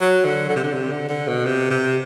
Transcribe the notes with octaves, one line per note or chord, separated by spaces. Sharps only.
F#3
D3
D3
C3
D3
C3
D3
D3
B2
C3
C3